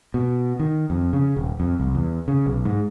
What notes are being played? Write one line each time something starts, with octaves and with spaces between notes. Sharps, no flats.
B2
D#3
F2
C#3
D#1
F2
C2
E2
C#3
B1
G#2